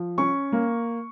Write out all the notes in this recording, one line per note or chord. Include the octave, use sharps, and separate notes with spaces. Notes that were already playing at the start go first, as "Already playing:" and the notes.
Already playing: F3
C#4 C#6
A#3